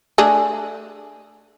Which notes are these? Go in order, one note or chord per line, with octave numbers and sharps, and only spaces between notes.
A3 D4 G#4